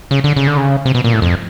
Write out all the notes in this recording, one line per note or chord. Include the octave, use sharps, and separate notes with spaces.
C#3
D3
C#3
D3
C#3
C3
B2
A#2
A2
F2